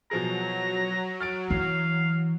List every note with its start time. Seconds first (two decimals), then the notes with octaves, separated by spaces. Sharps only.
0.11 B2 F3 F#3 G#4 A#5
1.20 F6 A6 D7
1.50 E3 F5